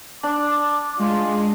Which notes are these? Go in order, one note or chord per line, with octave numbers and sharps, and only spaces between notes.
D4 D6
G#3 F4